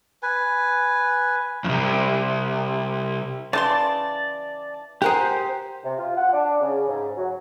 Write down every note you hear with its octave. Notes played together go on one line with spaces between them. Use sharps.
B4 G#5
C2 F2
C#3 E3 D5 A5 C6
G4 G#4 A#4 C5 F#5
C3
F4
F#5
D4
C#3
G#2
F#3